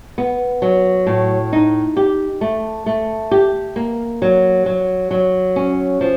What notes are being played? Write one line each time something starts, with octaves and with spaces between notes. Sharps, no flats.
B3
F#3
A2
D#4
G4
A3
A3
G4
A#3
F#3
F#3
F#3
C#4
F3